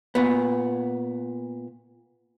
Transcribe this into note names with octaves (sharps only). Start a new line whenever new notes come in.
A#2 B3